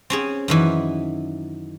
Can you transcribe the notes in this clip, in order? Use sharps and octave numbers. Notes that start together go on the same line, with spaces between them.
C4 C#4 G#4
F#2 D#3 E3